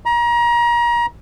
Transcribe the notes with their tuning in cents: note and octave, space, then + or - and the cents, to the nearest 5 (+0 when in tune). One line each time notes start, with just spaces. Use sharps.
A#5 +30